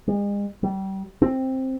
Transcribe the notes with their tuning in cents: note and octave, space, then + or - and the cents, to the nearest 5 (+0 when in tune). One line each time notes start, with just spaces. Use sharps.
G#3 -40
G3 -30
C4 +5